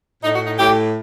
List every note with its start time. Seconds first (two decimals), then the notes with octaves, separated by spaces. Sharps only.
0.23 A2 D#4
0.34 F#4
0.46 D#4
0.58 A2 G4